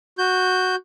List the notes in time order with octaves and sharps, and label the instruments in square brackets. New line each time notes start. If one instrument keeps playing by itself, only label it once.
[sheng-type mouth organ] F#4 G6